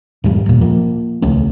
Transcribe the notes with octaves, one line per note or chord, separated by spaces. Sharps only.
E2 G#2 G3
D#1 A#2
F3 A#3
D#1 C#2 A3 C#4